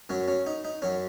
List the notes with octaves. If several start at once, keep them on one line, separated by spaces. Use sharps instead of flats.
F#2 F#3 C#4
C#4
D#4
D#4
F#2 F#3 C#4